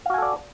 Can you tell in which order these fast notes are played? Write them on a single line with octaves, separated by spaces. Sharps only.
F5 F#4 G#5 A4 D5